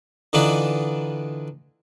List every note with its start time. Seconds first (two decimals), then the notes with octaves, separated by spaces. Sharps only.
0.33 D3 E3 D4 D#4 F4 B4